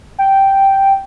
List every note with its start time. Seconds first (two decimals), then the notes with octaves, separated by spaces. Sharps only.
0.19 G5